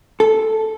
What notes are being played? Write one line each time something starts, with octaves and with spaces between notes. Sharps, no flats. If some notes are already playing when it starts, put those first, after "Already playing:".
A4